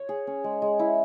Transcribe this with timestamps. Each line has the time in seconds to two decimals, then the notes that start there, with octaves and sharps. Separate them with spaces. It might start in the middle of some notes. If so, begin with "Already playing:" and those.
Already playing: C#5
0.09 G#4
0.27 C#4
0.44 G#3
0.62 G#3
0.79 E4